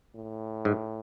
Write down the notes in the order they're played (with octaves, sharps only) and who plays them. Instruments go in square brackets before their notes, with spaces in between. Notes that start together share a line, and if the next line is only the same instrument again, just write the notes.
[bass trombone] A2
[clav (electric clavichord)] G#2